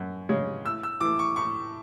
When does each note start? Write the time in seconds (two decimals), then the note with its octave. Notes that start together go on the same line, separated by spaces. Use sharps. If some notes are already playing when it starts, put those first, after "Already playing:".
Already playing: F#2
0.29 C#3 G#3 C#4
0.65 A2 E6
0.83 E6
1.00 E3 A3 D6
1.19 C#6
1.36 A2 C#6